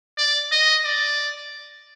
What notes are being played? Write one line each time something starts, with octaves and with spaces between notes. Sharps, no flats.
D5
D#5
D5